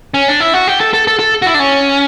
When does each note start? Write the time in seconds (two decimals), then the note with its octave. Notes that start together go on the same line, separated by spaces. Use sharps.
0.14 C#4
0.28 D4
0.40 E4
0.53 F#4
0.68 G4
0.80 A4
0.93 A4
1.07 A4
1.19 A4
1.42 F#4
1.46 E4
1.54 D4
1.59 C#4